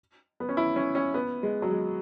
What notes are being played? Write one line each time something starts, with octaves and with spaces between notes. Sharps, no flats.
B3
C#4
E4
C#4
C#4
B3
G#3
F#3
G#3